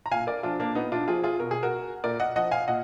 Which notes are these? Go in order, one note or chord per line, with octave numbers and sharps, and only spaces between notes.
A#5
A#2 F5 G#5
A#4 D5
F3 D4 F4
A#3 D4
A#2 B3 D#4
D4 F4
F3 F4 G#4
F4 G#4
B2 A#4
G#4
F#4 A#4
A#2 A#4 D5
D#5 F#5
F3 D#5 F#5
F5 G#5
A#2 D#5 F#5